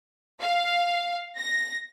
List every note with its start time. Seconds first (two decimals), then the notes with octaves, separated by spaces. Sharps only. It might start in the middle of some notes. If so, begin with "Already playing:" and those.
0.40 F5
1.36 A#6